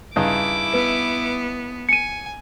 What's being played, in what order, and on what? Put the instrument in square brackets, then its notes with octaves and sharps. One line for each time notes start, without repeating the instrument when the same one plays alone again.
[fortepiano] G2 C#3 D#4 [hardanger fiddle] E4 D6
[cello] B3 [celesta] B4
[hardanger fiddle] G#5 [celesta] C#7 D#7